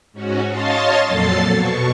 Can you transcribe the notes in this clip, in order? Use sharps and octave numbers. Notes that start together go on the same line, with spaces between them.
G#2 C#4 F#4
C#5 D#5 F5 A5 C6 A6
F2 A#2 F#3 A4 A6 C7
B2 C#6